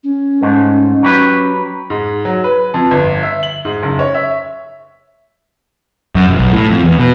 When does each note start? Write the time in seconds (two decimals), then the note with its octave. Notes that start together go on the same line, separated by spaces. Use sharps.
0.04 C#4
0.41 G#2 A3
1.03 F#3 G4 B4
1.90 G#2
2.25 F#3
2.44 B4
2.74 F2
2.91 G1
3.23 E5
3.43 F#7
3.65 G#2
3.83 F#1
3.99 C#5
4.15 E5
6.15 F#2
6.27 E1
6.39 B1
6.52 A2
6.69 F2
6.83 E2
6.99 B2